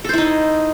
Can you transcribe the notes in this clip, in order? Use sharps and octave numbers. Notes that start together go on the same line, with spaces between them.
D#4 E4 A4 C5